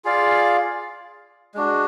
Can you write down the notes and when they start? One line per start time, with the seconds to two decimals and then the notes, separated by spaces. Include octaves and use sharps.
0.05 F4 G#4 D5 F5
1.54 G#3 D4 F#4